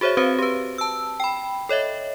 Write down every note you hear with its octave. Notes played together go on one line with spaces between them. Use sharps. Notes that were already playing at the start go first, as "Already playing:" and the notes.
F#4 G#4 C5 C#5 E5
C4 F#4 B4 C5 F5
G4 B4
A5 E6
G5 B5
A4 C#5 D#5 E5